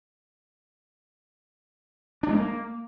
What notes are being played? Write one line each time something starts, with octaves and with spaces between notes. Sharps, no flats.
D4
G#3
A#3